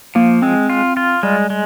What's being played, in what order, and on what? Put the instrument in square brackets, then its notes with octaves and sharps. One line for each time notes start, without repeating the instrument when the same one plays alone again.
[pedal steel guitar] F3 [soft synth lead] A#3
[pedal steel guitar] G#3 [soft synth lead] C4
[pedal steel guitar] F4
F4
[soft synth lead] G3 [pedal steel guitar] G#3
[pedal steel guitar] G#3